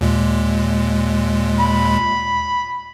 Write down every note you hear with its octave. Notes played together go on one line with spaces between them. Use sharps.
D#2 A#2 G#3
B5